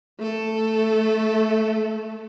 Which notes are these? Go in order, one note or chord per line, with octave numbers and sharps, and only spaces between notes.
A3 A4